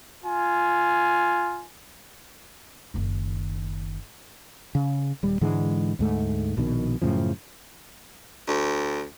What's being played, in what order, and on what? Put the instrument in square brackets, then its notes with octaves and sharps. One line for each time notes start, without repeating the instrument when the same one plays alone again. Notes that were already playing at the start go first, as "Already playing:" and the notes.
[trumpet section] F4 G#5
[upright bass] F#1 D#3
[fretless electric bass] C#3
D#1 G3
G#2 D3 E3 G#3
D2 G#2 A3
A#1 B2 D#3
F#2 A2 C#3 F3
[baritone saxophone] D2